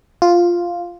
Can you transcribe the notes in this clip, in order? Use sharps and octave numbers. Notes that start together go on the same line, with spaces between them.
F4